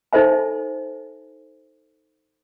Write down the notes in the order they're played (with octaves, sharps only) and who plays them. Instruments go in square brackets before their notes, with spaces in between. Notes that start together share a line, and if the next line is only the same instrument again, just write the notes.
[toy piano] D#4 A4 C5 E5 G#5